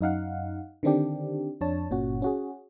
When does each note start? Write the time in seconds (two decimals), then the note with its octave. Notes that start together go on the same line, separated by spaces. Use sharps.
0.01 F#2 D#4 F5 F#5
0.83 D3 D#3 C4 D4 G4
1.61 F2 D4 C#5 A5
1.90 G1 A#2 C#4 F#4
2.22 C#4 F#4 G#4